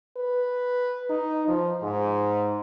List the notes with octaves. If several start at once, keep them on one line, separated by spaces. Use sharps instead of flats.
B4
D#4
F3
G#2